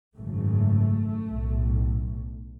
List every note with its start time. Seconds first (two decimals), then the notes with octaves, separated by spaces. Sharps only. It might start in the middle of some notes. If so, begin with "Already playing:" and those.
0.16 G#1 F#2 C#3 A3
1.28 B1 A2